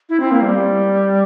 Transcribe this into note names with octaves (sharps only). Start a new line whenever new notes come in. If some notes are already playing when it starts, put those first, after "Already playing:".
E4
C4
A#3
G3